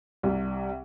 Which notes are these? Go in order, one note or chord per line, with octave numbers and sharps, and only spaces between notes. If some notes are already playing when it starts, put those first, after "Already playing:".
C2 C3 G3